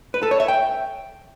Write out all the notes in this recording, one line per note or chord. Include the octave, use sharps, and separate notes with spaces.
B4
A4
C#5
E5
G5